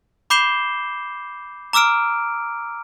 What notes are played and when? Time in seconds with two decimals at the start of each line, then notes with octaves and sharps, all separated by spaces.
0.30 B5 D6 G6 C7 E7 G7
1.73 A#5 D6 E6 F6 D7